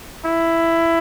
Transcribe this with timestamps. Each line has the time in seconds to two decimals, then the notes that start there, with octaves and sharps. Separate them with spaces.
0.25 E4